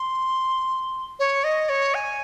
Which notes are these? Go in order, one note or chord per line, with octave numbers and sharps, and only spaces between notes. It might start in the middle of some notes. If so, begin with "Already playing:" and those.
Already playing: C6
C#5
D#5
C#5
G#5